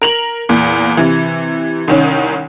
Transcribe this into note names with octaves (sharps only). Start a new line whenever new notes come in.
A#4 F7 F#7
E2 A#2
C3 E3
C2 D#3 C#4